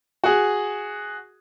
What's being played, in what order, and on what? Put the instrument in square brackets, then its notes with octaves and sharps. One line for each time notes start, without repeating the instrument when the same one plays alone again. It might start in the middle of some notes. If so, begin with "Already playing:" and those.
[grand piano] F#4 G#4